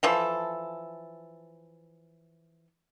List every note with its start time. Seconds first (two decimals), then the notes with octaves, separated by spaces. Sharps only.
0.03 E3 F3 A4